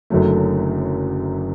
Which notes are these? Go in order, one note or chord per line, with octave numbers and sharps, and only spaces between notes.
F#1 F#2 D3 F#3 A3